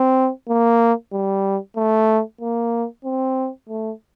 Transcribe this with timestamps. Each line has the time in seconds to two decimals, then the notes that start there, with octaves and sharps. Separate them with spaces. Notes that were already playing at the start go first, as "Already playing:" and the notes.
Already playing: C4
0.48 A#3
1.12 G3
1.77 A3
2.41 A#3
3.05 C4
3.69 A3